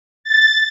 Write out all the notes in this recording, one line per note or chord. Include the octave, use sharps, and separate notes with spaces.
A6